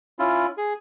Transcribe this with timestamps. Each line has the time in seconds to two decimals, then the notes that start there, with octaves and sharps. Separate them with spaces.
0.19 C#4 E4 F4
0.57 G#4